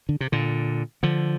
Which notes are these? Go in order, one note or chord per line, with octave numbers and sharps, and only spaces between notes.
D3
C3
A#2 D3
D3 F3